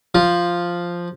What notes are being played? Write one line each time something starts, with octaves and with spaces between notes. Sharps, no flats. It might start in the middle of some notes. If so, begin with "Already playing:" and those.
F3